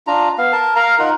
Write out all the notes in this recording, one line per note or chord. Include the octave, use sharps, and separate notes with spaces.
D4 F4 A#5
B3 F5
A#4 A5
A#4 F5 A#5
D#4 F4 A#4 F#5